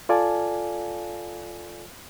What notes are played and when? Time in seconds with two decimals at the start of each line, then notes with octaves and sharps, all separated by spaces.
0.09 F4 A4 D5 F5 G#5 A5